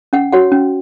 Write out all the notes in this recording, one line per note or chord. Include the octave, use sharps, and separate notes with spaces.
C#4 F#5
F#4 C#5 F#5
C#4